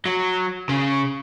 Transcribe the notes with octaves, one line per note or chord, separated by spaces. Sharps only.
F#3
C#3